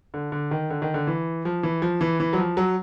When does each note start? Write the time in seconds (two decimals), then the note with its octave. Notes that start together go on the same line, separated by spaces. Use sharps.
0.14 D3
0.32 D3
0.51 D#3
0.70 D3
0.82 D#3
0.94 D3
1.07 E3
1.45 F3
1.63 E3
1.82 F3
2.01 E3
2.20 E3
2.33 F#3
2.38 F3
2.57 F#3